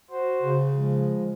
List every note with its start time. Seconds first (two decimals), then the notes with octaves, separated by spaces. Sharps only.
0.11 F#4 C5
0.42 C#3
0.75 F3 G#3